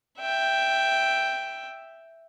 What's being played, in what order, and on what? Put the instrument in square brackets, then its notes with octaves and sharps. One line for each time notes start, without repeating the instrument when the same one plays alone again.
[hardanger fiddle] E5 G5